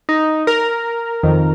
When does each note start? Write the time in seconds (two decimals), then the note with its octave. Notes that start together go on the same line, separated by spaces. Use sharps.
0.09 D#4
0.47 A#4
1.23 F2 D#3